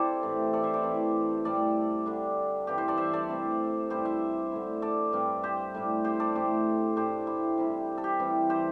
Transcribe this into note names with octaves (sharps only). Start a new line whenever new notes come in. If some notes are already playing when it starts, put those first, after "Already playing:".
Already playing: C3 E4 G4 A4 C5 D5
A2 E3 A3 C4
A4 D5
C5 E5
A4 D5
C3 E3 A3 E4
A2 G3 C4 A4 D5
D3 G3 D4
G2 E3 G3 C4 G4
G4 C5
A4 D5
C5 E5
A4 D5
C3 A3 E4
G2 G3 E4 G4 C5
C5 E5
D3 A3 E4
A4 D5
G2 G3 C4
G4 C5
A2 G3 D4
G4 C5
A4 D5
A2 A3 D4 G4 C5
A2 A3 D4 G4 C5
E4
C3 G3 E4
A4
G4
E3 G3 C4
G4 C5